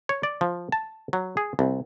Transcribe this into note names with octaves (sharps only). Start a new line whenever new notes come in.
C#5
D5
F3
A5
F#3
G#4
C2